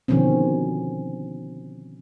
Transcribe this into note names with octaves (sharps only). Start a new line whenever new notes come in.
B2 D3 D#3 F3 C4 C#4